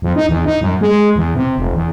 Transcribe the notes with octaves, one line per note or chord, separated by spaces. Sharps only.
F2
D#4
E2
D#4
F#2
G#3
E2
C3
F1
E2